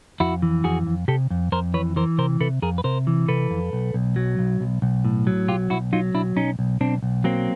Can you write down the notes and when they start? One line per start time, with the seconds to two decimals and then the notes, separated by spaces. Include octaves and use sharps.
0.20 F2 E4 F#4
0.42 E3
0.64 F2 F#4 G#4
0.87 F2
1.08 C3 G4 A4
1.30 F2
1.52 F2 A#4 C5
1.74 E3 B4 C#5
1.96 E3 A#4 C5
2.18 C3 A#4 C5
2.40 C3 A4 B4
2.62 F2 G#4 A#4
2.78 B4
2.84 C3 A#4 C5
3.07 E3
3.28 C3 A4 B4
3.51 F2
3.73 B1
3.94 B1
4.16 F#3
4.39 B1
4.61 B1
4.82 B1
5.05 A2
5.27 F#3
5.48 B1 F4 G4
5.70 B1 E4 F#4
5.93 F#3 D#4 F4
6.14 B1 D4 E4
6.36 B1 C#4 D#4
6.59 B1
6.81 B1 C4 D4
7.03 B1
7.24 F#3 A#3 C4